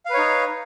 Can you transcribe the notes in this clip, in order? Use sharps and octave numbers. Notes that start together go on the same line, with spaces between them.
D#4 B4 C#5 F5